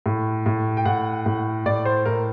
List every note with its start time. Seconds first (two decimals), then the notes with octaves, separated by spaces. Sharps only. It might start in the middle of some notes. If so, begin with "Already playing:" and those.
0.06 A2
0.46 A2
0.77 G5
0.85 A2 F#5
1.26 A2
1.66 A2 D5
1.85 C5
2.05 A2 A#4